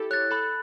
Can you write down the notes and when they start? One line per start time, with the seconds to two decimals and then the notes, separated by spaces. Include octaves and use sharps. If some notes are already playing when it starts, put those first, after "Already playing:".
Already playing: E4 G4 A4
0.11 C#5 F#6 A6
0.31 A4 B5